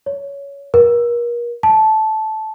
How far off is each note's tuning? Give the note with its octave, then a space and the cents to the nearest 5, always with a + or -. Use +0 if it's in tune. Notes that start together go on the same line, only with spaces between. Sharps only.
C#5 +15
A#4 +35
A5 -10